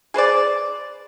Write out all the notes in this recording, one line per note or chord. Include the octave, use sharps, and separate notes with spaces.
G#4 B4 C5 D5